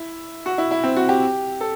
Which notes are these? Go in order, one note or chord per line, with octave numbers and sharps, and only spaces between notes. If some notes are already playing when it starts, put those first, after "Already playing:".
Already playing: E4
F#4
E4
E4
C4
F#4
G4
A4